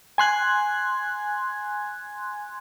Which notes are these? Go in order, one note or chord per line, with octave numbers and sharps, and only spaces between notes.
G#5 C6 F#6 G#6